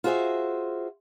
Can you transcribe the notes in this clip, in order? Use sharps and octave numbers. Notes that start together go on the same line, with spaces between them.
F4 F#4 G#4 C5 E5